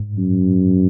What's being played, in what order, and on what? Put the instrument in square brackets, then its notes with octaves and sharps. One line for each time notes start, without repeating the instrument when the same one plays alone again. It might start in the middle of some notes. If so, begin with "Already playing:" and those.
Already playing: [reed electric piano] G#2
[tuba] F#2